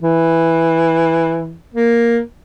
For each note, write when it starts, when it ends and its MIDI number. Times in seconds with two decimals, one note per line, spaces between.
0.02 1.56 52
1.74 2.20 58